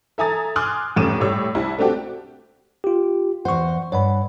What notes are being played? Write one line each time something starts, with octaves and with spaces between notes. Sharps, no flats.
A4 E5 G#5 A#5 D#6 A6
G#5 C6 D6 D#6 F6 F#6
F1 A2 C#4 D6 D#7 E7
A2 G3 C#5 E6
C2 E4
A3 C4 D4 F#4 G4
F4 G4
E2 C5 F#5 C#6
G2 C#5 F#5 B5